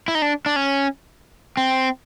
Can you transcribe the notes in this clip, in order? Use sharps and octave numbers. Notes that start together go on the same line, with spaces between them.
E4
D#4
D4
D4
C#4
C4